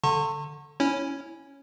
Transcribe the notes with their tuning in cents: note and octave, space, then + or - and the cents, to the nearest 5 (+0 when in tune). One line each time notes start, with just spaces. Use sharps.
D3 +0 A5 +45 C#6 -25
C#4 +0 E4 -5 C#5 +0